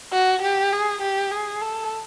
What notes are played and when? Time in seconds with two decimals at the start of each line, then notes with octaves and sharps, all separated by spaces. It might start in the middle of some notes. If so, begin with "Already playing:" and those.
0.13 F#4
0.42 G4
0.72 G#4
1.02 G4
1.31 G#4
1.61 A4